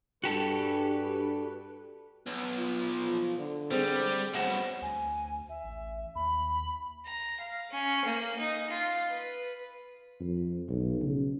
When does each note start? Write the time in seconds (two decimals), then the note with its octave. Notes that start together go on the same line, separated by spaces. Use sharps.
0.24 G2 D4 F#4 G4 A4 B4
2.27 B1 B3
2.57 F4
3.04 F3
3.39 D3
3.71 G3 C4 G#4 C5
4.34 G2 B2 F#3 F#5 A#6 E7
4.82 D2 G#5
5.48 E5
5.64 A1
6.15 D#2 B5
7.05 A#5
7.40 F5
7.71 C#4
8.05 A#3
8.39 D#4
8.69 F4
9.09 B4
10.20 F2
10.69 B1
11.02 C#3